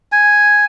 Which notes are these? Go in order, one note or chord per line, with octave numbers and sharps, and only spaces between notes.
G#5